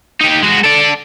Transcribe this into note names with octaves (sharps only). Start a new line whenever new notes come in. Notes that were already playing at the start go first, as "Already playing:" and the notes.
D#4 G4
G#3 F#4
A4 D5